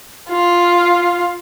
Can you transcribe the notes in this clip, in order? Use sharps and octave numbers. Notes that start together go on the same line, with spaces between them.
F4